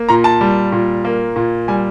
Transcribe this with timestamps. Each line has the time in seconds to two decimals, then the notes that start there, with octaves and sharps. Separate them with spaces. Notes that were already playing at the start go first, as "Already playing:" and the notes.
Already playing: A#3
0.09 A#2 A#5
0.24 A5
0.41 G3
0.72 A#2
1.05 A#3
1.36 A#2
1.68 G3 G#5